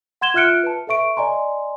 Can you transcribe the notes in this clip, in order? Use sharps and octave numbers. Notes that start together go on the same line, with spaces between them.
F#5 C6 G#6 E7 G7
F4 E5 F6 F#6 C#7 D7
B4 A5
A4 B4 E5 C#6 D7
D5 D#5 G#5 A#5 C6